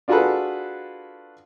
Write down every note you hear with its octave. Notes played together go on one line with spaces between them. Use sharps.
D4 F4 F#4 G#4 A4 B4